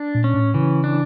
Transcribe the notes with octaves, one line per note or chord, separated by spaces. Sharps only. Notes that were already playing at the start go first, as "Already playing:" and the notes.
Already playing: D4
A#2
C#4
A2
C#3 E3
D4